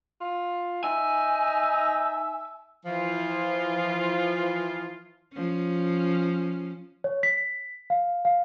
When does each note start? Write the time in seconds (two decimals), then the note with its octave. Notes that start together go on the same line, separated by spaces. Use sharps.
0.21 F4
0.84 D#4 E5 G#5
2.85 E3 F3 F4
5.34 F3 C#4
7.04 C#5
7.23 B6
7.90 F5
8.25 F5